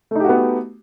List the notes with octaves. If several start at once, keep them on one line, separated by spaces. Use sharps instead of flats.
A3 B3 D#4 F#4 G4